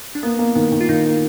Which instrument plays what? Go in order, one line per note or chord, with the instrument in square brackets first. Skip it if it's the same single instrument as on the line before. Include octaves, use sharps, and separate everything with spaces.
[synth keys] D4
[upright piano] A#3 [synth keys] B3
[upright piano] A#3
[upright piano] D#3 [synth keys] B3
[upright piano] D#3
[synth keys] F4
[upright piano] D#3 [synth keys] D#4
[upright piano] A#3